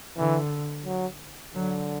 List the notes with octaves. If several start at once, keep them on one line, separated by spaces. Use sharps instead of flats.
D3 E3
F#3
D3 F#3